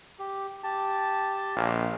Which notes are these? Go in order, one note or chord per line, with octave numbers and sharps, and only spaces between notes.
G4
G4 A5
A#1 F5